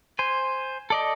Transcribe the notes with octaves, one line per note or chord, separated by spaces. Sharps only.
C5 G#5
A4 D5 D#5